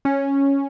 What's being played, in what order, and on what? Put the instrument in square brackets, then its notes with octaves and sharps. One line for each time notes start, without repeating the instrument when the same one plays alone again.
[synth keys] C#4